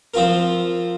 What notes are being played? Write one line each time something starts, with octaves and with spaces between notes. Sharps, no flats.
F3 C4 F4 A#4